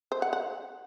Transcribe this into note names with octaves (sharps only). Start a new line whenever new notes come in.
C5
F#5
F#5